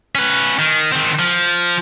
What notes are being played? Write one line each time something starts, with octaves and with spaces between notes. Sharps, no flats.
C#4 B4
D#3
D#3 C4
F3